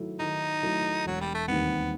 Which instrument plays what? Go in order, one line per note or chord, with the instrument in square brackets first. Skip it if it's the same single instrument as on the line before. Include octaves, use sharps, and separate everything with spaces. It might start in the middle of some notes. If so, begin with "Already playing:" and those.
Already playing: [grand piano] D#3 F#3 A3 E4 A4
[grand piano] D#3 [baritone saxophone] D#4
[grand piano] F#3 A3 E4 A4
[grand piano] E1 [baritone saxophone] F#3
[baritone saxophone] G3
A3
[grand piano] D#2 D#3 G3 C4 [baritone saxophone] B3